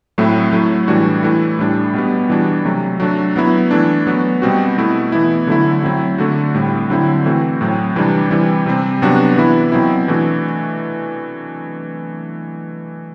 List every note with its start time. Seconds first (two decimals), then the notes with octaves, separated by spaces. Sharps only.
0.18 A2 F#3 A3 C4 E4
0.53 F#3 A3 E4
0.88 A2 E3 G3 D4 F#4
1.23 E3 A3 E4
1.59 A2 G3 D4
1.94 B2 G3 B3
2.29 E3 G3 D4 F#4
2.65 C3 F#3 A3
3.00 F#3 A3 D4 F#4
3.36 F#3 B3 E4
3.71 E3 A3 D4
4.07 F#3 B3 F#4
4.42 B2 G3 C4 F#4
4.78 B2 A3 E4
5.12 E3 B3 E4
5.47 D3 F#3 A3 E4
5.83 F#3 C4 E4
6.18 D3 A3 D4 F#4
6.55 A2 G3 C4 E4
6.90 D3 F#3 C4 E4
7.25 E3 A3 C4 F#4
7.61 A2 F#3 C4
7.96 C3 E3 G3 D4
8.31 E3 G3 C4 E4
8.66 C3 G3 C4
9.02 C3 F#3 B3 D4 F#4
9.36 E3 B3 E4
9.72 B2 F#3 C4 E4
10.08 E3 A3 D4 F#4